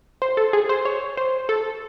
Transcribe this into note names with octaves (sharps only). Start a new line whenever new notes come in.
C5
A4
G#4
C5
C#5
C5
A4